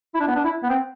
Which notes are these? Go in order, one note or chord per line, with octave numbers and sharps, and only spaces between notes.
E4
D4
B3
D4
E4
B3
C4